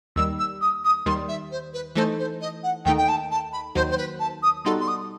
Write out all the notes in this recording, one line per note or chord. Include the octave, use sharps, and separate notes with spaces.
D#2 D#3 G3 E6
E6
D#6
D#6
D#2 D#3 G3 C6
E5
C5
B4
E3 A3 D#4 A4 C5
C5
D#5
F#5
D#2 D#3 A3 D#4 G5
G5
A5
A5
B5
D#2 D#3 F#3 C5
C5
B4
A5
D#6
B2 G3 D#4 F#4 A4 C6
C6
D#6